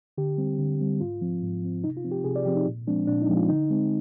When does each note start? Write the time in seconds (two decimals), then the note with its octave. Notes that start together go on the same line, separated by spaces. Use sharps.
0.18 D3 G4
0.38 G3 C4
0.58 D3
0.80 G3 C4
1.01 G#2 F4
1.21 F3 C4
1.42 G#2
1.62 F3 C4
1.84 C3 D#4
1.97 F4
2.04 F3 C4
2.11 G4
2.24 C3 G#4
2.36 D5
2.45 F3 C4 G4
2.56 D#4
2.66 A#2
2.87 F3 G#3 C4 D4
3.07 A#2 D4
3.22 D#4
3.29 F3 G#3 C4
3.36 F4
3.49 D3 D#4
3.71 G#3 C4